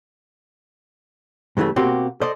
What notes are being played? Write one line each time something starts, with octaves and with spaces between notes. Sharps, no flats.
G2 C#3 E3 G3 A3
B2 A#3 C4 F#4 G4
A4 C5 D5 D#5